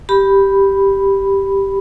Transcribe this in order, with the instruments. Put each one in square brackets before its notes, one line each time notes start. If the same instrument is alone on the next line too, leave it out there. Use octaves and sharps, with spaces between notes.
[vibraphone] G4 B5